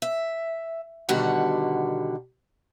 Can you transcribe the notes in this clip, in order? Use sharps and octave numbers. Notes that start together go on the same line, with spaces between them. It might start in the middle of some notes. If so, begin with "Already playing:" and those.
E5
B2 D3 D#3 G3 F#4 F#5